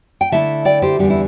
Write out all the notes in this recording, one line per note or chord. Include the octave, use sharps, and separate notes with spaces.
G5
D3 A3 E4 E5 A5
D5 G5
G4 C5
E2 D3 G3 G4
E4